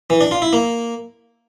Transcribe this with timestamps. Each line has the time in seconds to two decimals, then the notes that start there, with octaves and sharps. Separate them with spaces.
0.10 E3
0.21 D4
0.31 F4
0.42 E4
0.53 A#3